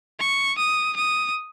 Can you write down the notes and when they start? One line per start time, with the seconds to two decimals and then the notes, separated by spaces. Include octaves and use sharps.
0.19 C#6
0.58 D#6
0.96 D#6